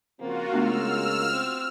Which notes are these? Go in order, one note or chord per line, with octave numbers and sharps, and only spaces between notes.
C#3 F3 A#3 C4 F4 F#4
C#3 G#3 A3 B3 D4 E6 F6
C4